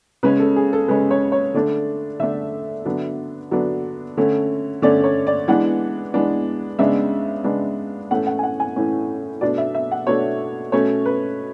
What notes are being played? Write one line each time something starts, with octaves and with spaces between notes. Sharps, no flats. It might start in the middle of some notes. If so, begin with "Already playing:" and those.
C#3 G#3 C#4 B4
A4
G#4
A4
C#3 G#3 C#4 B4
C#5
C#5
D3 A3 D4 D5
D3 A3 D4 E5
D3 F#3 B3 D4
D3 F#3 B3 D4
D3 A3 C#4
D3 A3 C#4 D5
C#5
D5
E3 G#3 B3 D4 F#5
E3 G#3 B3 D4
C#3 G#3 B3 D4 E5
C#3 G#3 B3 D4
A2 E3 A3 C#4 F#5
F#5
G#5
F#5
G#5
A2 E3 A3 C#4
B2 A3 D4 D5
E5
E5
F#5
B2 A3 D4 C#5
B2 A3 C#4 C#5
B4